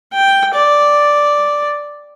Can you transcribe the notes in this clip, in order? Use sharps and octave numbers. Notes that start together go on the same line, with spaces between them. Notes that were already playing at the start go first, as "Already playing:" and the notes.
G5
D5